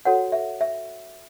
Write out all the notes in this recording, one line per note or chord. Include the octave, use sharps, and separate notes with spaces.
F#4 A4 C#5 F#5
E5
E5